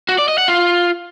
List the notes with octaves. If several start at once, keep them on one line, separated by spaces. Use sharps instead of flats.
F#4
D5
D#5
F#5
F4